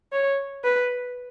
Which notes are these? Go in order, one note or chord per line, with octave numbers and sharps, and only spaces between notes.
C#5
B4